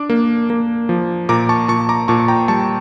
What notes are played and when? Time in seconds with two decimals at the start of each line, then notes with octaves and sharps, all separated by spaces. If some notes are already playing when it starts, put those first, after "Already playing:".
Already playing: D4 D6
0.10 A#3
0.50 A#3
0.89 F3
1.29 A#2 A#5 D6
1.49 A5 C#6
1.68 A#2 A5 C#6
1.89 A#5 D6
2.08 A#2 A5 C#6
2.20 C#6
2.28 G5 A#5
2.48 G3 A5 C#6